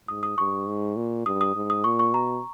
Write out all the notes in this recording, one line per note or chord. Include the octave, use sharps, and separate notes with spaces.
G#2 D#6
D#6
G2 C#6
G#2
A#2
G2 D#6
D#6
G#2
D#6
A#2 C#6
C#6
B2 A#5